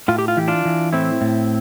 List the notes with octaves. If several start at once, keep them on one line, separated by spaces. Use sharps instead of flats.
A2 F4
G4
F4
E3 G4
D4 F4
E3
A2 C4 E4
A2